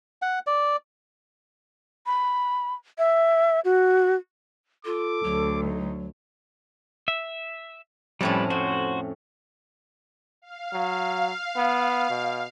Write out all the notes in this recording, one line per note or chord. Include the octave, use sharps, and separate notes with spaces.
F#5
D5
B5
E5
F#4
F4 A4 D6
D2 F#3
D#4
E5
F2 A2 G3 C#4 A4 B4
A2 F#4 C5
F5
F#3
B3
B2